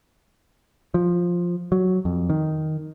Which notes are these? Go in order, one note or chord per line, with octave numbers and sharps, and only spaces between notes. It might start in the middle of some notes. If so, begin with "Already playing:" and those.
F3
F#3
F2
D#3